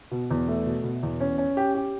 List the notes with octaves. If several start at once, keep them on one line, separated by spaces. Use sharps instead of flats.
B2
E2
A3
B2
B2
E2
C#4
C#4
G4
G4